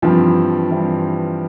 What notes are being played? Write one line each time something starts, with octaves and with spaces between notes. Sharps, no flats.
G2 E3 F3 G3 C4
G2 E3 G3 C4